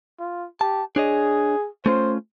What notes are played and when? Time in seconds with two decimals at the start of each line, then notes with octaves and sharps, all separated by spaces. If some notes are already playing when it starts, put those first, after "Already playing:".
0.20 F4
0.61 G4 A5
0.96 D4 G#4 C#5 D#5
1.86 A3 C#4 F4 C5